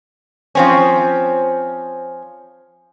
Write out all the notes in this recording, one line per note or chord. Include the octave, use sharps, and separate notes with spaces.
F3 C4 C#4